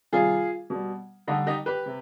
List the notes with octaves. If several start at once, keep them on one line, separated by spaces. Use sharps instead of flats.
C3 D#3 G3 F4 G#4
B2 G3
D3 G3 D#4 G4
D#4 G4
G4 B4
C3